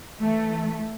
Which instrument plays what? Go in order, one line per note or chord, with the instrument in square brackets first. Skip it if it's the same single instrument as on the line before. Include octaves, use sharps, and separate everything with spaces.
[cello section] E3 A3